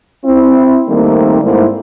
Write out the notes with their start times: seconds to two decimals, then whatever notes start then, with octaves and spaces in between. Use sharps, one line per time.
0.25 C4 E4
0.88 D#3 G3 A3 A#3 C4
1.43 G#2 G3 A3 A#3 E4 C5